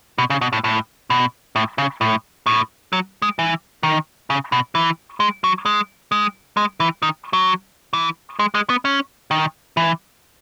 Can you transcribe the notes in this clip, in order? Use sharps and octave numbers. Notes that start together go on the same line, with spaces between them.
B2
C#3
B2
A2
A2
B2
A2
C#3
A2
A2
F#3
G#3
E3
D#3
C#3
B2
E3
G#3
F#3
G#3
G#3
G#3
E3
D#3
F#3
E3
G#3
G#3
B3
C#4
D#3
E3